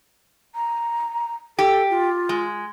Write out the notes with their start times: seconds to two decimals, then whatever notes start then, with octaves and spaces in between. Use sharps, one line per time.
0.55 A#5
1.59 G4 A4
1.90 F4
2.29 G#3